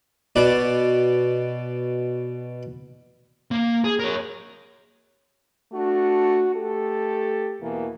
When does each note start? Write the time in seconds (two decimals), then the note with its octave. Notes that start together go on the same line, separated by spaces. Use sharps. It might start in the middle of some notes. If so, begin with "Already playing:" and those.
0.36 B2 D5
3.51 A#3
3.84 G#4
3.99 A#4 C#5
5.73 A3 D4 F#4
6.54 A3 G4 A4
7.61 E2 B2 E3 A#3